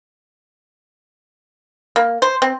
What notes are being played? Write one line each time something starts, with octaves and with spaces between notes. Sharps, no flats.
A#3
C5
C4